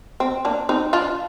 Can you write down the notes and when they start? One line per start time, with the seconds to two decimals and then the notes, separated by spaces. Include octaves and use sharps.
0.20 C4
0.45 A#3 D4
0.69 C4 D#4
0.93 D4 F4